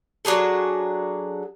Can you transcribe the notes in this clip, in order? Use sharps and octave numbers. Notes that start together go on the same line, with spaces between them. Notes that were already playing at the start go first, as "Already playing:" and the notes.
F#3 D4 G#4 A4